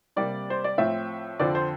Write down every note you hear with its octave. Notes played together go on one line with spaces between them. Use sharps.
C3 G3 A#3 D5
C5
D5
A2 F3 C4 E5
F2 D3 F3 C4 D5
C5